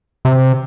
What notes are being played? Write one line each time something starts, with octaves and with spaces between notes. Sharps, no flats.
C3